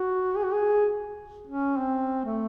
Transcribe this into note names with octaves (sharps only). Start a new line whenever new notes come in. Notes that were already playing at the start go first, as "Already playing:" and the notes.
Already playing: F#4
G#4
F#4
G#4
C#4
C4
A3